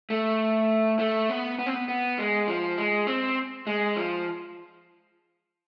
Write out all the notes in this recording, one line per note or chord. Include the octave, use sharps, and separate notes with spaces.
A3
A3
B3
B3
C4
B3
B3
G#3
F3
G#3
C4
G#3
F3